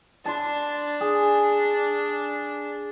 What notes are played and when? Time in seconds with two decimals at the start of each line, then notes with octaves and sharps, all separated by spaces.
0.25 D4 A5 C6
1.00 G#4